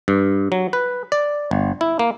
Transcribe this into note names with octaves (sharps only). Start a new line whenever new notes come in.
G2
F#3
B4
D5
G1
E4
A#3